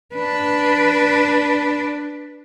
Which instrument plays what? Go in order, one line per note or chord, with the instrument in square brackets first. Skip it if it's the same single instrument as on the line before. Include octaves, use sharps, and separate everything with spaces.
[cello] D4 B4